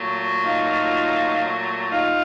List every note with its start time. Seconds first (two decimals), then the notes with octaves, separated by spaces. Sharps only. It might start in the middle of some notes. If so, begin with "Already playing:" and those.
Already playing: A#2 F#3 A3
0.44 D#4 F4
1.92 D#4 F4